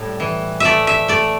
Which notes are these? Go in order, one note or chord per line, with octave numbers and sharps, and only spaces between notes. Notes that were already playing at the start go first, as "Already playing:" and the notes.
Already playing: A2 G3
E3
A3 D5 E5
E5
A3 D5